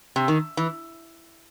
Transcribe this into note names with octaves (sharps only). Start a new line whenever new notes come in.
C3
D#3
E3